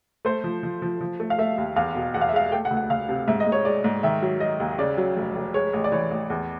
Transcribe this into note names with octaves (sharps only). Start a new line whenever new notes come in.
A3 C5
F3
F3
F3
F3
A3
F5
A3 E5
D#2
E2 F5
B2
E2 F#5
F5
E5
G#3 F5
A3 G5
F#5
D2
F#5
D2 F5
C3
G#2 E5
D#5
G#2
C#5
G#3 D5
G#2
D#3 E5
F#3
F#3 D#5
D#2
C#3 D5
F#3
F1
F1
G#3 C#5
A1
D5
E3 C#5
A1
E2